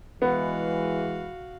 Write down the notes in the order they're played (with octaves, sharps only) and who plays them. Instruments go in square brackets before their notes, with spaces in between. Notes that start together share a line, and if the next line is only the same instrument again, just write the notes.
[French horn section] E3 G#3 [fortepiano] B3 [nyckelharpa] F#4 F5